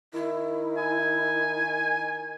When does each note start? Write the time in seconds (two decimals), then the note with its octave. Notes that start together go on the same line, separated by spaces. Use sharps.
0.14 D#3 E4
0.78 G#5